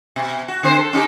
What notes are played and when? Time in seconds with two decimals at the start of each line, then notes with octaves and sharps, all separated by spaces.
0.16 B2
0.48 F#4
0.63 D3 C4 C5
0.78 A4
0.93 C#4 D#4 G4